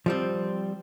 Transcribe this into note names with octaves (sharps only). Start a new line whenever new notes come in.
F3 G3 C4